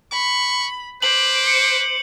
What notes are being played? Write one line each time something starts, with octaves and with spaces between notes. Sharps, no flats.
B5 C#6
B4 C5 D6 F#7
C#7